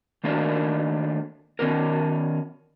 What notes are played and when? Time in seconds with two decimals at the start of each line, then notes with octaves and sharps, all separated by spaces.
0.24 D#3 A3 A#3 D4 A#4
1.59 D#3 B3 C#4 A#4